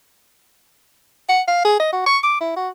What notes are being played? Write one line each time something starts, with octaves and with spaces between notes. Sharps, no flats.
F#5
F5
G#4
D#5
F#4
C#6
D6
E4
F#4